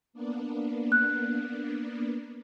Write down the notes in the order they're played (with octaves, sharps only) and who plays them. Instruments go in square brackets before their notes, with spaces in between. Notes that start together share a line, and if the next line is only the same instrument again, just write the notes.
[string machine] A#3 B3 D4
[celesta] F#6